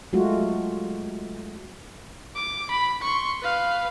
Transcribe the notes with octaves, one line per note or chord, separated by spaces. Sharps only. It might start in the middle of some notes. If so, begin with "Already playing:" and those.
F#3 G#3 A3 F4 F#4
D6
B5
C6 C#6
B4 F5